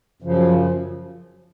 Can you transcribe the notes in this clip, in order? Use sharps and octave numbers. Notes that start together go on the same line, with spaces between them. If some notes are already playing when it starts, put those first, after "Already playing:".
F#2 C#3 F3